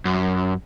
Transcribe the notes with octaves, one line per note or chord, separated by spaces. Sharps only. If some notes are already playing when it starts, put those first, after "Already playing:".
F#2